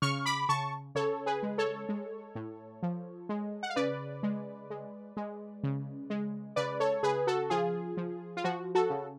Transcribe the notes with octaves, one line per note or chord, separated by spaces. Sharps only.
C#3 C#6 F6
B5 D6
C#3 A5 C#6
C#3 A4 C#5
G#4 B4
G#3
A4 C#5
G#3
A2
F3
G#3
F#5
F5
C#3 B4 D5
G#3
G#3
G#3
C#3
G#3
C#3 B4 D5
A4 C#5
C#3 G#4 B4
F#4 A4
F3 F4 G#4
F3
F4
F3 F#4
F#4 A4
C#3